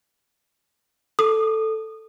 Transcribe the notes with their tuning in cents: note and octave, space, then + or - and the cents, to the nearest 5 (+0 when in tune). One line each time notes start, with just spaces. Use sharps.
A4 +0 D#6 -20